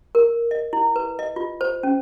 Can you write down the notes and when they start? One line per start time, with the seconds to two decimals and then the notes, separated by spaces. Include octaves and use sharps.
0.15 A#4
0.51 D#5
0.73 E4
0.96 B4
1.19 D#5
1.36 F4
1.61 C5
1.83 C#4